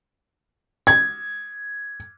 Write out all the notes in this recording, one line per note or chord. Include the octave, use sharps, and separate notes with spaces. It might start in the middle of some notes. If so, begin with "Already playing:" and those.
G#6